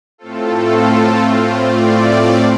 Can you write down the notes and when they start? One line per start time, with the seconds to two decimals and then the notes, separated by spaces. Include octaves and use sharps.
0.18 A2 A3 C4 F4 A4
1.31 C5
1.60 D5